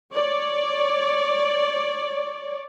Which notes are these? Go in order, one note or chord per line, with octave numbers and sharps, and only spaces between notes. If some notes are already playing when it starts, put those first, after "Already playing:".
C#5 D5